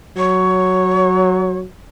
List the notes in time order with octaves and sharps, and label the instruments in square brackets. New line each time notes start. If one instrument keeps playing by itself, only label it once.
[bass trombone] F#3 [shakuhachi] C#5